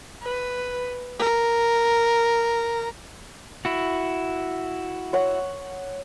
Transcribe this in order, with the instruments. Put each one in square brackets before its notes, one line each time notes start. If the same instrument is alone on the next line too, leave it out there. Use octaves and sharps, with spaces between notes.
[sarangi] B4
A#4
[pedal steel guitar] E4 F#4
[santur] C#5 F#5